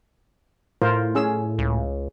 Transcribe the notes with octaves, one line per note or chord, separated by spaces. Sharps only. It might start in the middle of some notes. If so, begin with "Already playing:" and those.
A2 F4 A#4 C5
C#4 G#4 E6
C#2